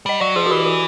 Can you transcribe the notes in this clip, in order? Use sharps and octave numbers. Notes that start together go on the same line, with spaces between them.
G3 D#5
F#3 D5
F3 G#4
F#4
E3 G4
F#4